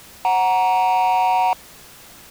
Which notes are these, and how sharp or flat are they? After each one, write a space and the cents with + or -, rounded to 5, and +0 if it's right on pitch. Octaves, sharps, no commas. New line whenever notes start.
F#5 +0 A#5 +10